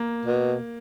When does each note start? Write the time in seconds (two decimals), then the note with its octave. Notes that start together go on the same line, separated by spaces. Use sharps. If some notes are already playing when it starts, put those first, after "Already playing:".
Already playing: A#3
0.25 B2